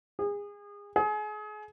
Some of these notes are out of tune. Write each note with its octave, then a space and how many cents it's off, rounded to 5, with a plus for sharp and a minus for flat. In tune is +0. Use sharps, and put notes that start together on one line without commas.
G#4 -30
G#4 +30